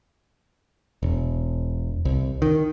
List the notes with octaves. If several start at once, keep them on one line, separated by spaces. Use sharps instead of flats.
E1
C2
D#3